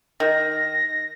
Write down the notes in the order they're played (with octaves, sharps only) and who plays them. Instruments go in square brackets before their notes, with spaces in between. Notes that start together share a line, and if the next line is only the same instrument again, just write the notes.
[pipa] D#3 [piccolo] A#6